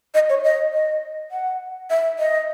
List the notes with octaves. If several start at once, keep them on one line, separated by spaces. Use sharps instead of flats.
D#5
C#5
D#5
D#5
F#5
E5
D#5